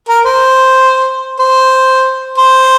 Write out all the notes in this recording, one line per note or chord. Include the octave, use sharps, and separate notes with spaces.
A#4
C5
C5
C5